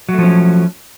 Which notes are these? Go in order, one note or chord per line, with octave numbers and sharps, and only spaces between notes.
F3 F#3 A3 C#4